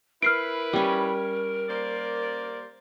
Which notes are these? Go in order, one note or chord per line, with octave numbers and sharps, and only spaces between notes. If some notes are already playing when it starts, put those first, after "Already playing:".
E4 A#4 B4 F6 C7 D7
G3 C#4
A#3 C5 D5